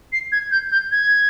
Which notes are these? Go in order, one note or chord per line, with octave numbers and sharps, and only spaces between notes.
C7
G#6
G6
G6
G#6